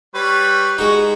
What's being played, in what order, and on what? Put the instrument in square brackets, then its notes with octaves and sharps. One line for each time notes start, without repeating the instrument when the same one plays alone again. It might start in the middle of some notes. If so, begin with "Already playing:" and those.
[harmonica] G3 B4 C#5
[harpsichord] G#3 D#4 [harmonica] F#4